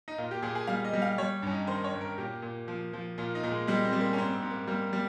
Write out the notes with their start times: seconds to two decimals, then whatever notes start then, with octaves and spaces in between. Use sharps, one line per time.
0.08 D#4
0.18 A#2 F4
0.31 G4
0.42 A#2 G#4
0.55 G#4
0.67 G3 F5
0.85 D#5
0.93 G3
1.02 F5
1.18 G3 C#5
1.42 G2 C#4
1.52 D#4
1.67 D#3 C5
1.84 C#5
1.93 G2
2.01 A#4
2.18 A#2 G4
2.42 A#2
2.68 F3
2.93 F3
3.18 A#2 F4
3.35 D#4
3.43 A#2
3.51 G#3
3.67 G3 G#3
3.85 C4
3.93 G3
4.01 A#3
4.13 C#4
4.17 G#2 C4
4.35 C4
4.42 G#2
4.51 A#3
4.67 G3 A#3
4.93 G3